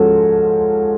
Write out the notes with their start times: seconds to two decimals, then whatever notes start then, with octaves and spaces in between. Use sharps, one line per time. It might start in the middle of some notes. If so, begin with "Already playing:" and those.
Already playing: G#2 F3 G#3 C#4 F#4 A4